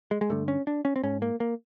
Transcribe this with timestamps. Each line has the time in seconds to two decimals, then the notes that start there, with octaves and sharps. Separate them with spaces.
0.11 G#3
0.21 G#3
0.30 G2 D3 A3
0.48 C#4
0.67 D4
0.85 C#4
0.96 C4
1.04 G#2 C#4
1.22 A#3
1.40 A#3